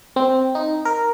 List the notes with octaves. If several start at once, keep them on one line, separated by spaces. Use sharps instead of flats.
C4
D#4
A#4